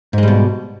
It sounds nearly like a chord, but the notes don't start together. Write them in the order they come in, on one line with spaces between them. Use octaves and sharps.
G#2 G#3 G3 B2